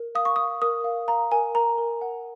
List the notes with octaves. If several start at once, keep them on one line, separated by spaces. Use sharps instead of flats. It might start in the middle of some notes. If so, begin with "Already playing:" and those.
Already playing: A#4
F5 D#6
C#6
F5 D#6
A#4 D#6
F5
F5 A#5
A#4 G#5
A#4 A#5
A#4
F#5